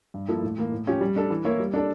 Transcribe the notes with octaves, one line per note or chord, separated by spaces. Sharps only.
G2
F3 A#3 E4 A4
A2
E3 A#3
A2
F3 C#4 G4
G3
D4 A4
E3
A#3 E4 A#4 C#5
G3
D4 A4 D5